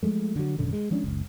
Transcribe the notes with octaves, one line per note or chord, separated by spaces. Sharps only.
F3 G#3 A3
D3 F#3
G#1 F#2 B2 D3
G#3
F3 G#3 C#4 D4
F#1 C#2